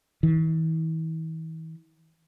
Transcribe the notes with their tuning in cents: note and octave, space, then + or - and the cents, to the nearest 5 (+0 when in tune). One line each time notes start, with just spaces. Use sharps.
E3 -45